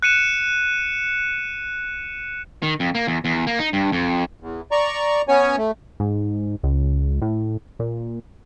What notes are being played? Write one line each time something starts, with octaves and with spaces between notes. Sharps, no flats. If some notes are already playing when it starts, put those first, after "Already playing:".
F#6 C#7 D#7 E7
D#3
F2
A#3
E2
E2
A#3
D#4
G2
F2
E2
D5 A#5 C#6
B3 C#4 C#5 G#5
A3
G#2
C#2
A2
A#2